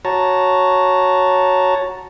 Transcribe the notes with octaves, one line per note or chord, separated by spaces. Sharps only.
F#4 C#5 A5 A#5